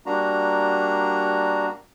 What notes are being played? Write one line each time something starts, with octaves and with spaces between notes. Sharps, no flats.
G3 A#3 D4 F#4 A#5